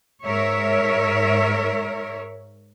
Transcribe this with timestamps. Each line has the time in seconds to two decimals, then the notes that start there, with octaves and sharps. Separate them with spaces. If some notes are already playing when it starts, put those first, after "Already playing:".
0.25 G#2 A#4 C#5 E5